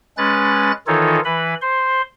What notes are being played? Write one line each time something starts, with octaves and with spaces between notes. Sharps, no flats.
G#3 C#4 B4 F#6 A6
D#3 E3 D#4 F4 A4 C#5
E3 B4 B5
C5 C6